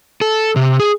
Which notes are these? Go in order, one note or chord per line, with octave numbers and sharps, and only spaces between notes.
A4
C3
G#4